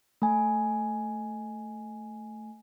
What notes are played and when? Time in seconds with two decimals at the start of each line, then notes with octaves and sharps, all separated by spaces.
0.22 A3 G#5